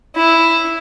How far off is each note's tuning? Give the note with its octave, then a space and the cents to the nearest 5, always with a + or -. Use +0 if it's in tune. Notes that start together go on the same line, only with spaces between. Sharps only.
E4 +0